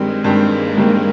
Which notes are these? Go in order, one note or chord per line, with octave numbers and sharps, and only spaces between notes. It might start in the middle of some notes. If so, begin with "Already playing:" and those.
Already playing: G2 D#3 G3 G#3 C4
G2 D#3 G3 A#3 C4
G2 D#3 G3 C4